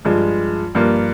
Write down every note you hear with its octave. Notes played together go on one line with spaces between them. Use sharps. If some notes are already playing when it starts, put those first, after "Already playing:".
G2 F3 G#3
G2 F3 A#3 F4